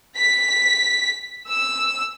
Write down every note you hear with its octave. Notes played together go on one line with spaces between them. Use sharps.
B6
E6